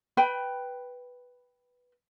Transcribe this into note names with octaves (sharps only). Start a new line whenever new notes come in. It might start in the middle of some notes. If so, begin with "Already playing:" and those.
B4 G5 B5